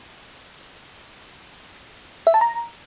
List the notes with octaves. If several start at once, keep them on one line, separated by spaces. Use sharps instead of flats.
E5
A5
A#5